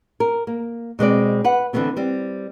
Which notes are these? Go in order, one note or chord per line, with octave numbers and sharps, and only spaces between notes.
A#4
A#3
B2 G#3 C4 D5
B4 F#5
D3 E3 F3 A3 B3 C4
G3 C4